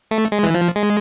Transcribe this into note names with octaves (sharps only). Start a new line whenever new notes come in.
A3
G#3
E3
F3
G#3